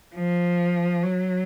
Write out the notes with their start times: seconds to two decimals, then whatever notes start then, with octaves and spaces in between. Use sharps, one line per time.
0.15 F3
1.03 F#3